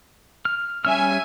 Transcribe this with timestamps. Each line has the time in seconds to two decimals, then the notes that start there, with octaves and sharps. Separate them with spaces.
0.45 F6
0.85 G3 C#4 E5 G#5 F6